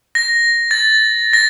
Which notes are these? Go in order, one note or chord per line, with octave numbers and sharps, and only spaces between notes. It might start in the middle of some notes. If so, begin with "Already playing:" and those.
A#6
A6
A#6